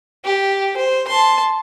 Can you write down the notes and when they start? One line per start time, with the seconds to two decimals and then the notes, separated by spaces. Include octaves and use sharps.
0.24 G4
0.77 C5
1.08 A5 C6